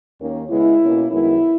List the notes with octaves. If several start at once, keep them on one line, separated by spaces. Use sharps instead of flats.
D#2 D#3 A#3 C#4
C#3 G#3 B3 E4
B2 A#3 C#4
F#2 D#3 G#3 B3 E4